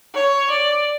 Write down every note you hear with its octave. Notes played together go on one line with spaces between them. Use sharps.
C#5
D5